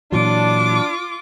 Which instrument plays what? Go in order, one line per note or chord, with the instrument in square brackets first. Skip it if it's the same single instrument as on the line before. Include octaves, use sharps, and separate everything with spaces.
[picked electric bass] A#2 E3 F#3 [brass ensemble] D4 [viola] F4 D6